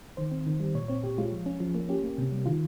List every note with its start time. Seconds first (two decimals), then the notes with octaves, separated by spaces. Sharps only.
0.17 D#3 C5
0.32 C4
0.46 D#3
0.60 G3
0.74 A#2 C#5
0.88 C4 C#5
1.03 A#2 G4
1.18 G#3 F4
1.32 F3
1.46 C#4
1.60 F3
1.75 A#3
1.89 C#4 G4
2.04 A#3
2.18 C3
2.32 G3
2.46 D#3 F4